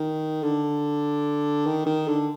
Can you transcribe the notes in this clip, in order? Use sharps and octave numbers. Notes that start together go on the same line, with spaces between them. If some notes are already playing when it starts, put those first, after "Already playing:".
Already playing: D#3
D3
D#3
D#3
D3